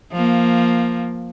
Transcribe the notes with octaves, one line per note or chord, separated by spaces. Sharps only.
F3 A#3